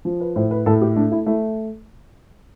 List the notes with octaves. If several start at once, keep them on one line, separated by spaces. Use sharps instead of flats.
F3
B4
A2 C5
B4
A2 A4
G4
A3 D4
E4
A3 E4